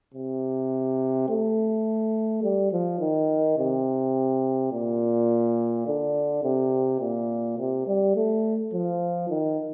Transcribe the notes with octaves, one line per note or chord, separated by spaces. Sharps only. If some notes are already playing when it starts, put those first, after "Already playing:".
C3
A3
G3
F3
D#3
C3
A#2
D3
C3
A#2
C3
G3
A3
F3
D#3